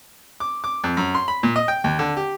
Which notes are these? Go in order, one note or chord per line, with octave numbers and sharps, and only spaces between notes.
D6
D6
F2
F#2
C6
B5
A#2
D#5
G5
D#2
D3
G4